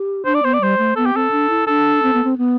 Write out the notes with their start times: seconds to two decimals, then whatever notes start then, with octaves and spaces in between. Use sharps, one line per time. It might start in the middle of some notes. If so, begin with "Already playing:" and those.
Already playing: G4
0.25 D4 C5
0.34 D5
0.43 B3 C5
0.54 D5
0.61 G3 C5
0.78 A3
0.96 B3 A4
1.06 G4
1.14 C4 A4
1.31 D4
1.50 E4
1.67 D4 A4
2.03 C4
2.14 B3
2.24 C4
2.38 B3